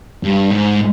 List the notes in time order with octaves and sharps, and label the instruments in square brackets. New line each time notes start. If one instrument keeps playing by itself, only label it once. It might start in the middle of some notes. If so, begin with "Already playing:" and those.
[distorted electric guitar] G2
G#2